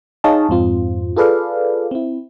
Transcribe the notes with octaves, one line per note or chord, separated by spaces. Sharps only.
D#4 G#4 C#5 D#5 F5 A5
F2 G#2 C4 F4
F4 G#4 A4 B4 D5 F5
C4 E4